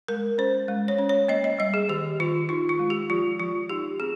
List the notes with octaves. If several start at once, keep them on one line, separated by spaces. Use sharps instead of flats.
G#3 A#4
C#4 C5
G#3
C#5
C#4
C#5
A#3 D#5
D#5
G3 D#5
G#4
D#3 G4
D#3 F4
D#4 F4
F4
G#3
G4
F3 F4
F3 F4
D#4 G4
C4 G#4